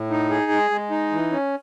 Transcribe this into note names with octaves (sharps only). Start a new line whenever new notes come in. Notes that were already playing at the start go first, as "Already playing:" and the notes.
Already playing: A2
D#4
G#4
G#3
G#3
D#4
E3
C#4